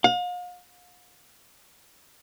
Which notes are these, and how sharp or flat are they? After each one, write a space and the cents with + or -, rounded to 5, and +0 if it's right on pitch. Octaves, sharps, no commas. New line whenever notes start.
F5 +40